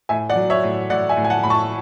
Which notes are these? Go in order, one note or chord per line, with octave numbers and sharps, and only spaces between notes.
A2 E5 G#5
D5 F#5
F#3
C#5 E5
A2
A2 D5 F#5
E5 G#5
A2
G#5
F#5 A5
A2 B5
A5 C#6